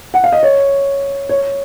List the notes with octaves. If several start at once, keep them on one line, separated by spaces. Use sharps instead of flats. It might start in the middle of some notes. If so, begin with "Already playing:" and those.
F#5
F5
D#5
C#5
C#5